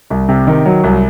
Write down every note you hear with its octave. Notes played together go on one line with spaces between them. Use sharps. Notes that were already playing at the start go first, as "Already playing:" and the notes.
C2
C3
D#3
F#3
C2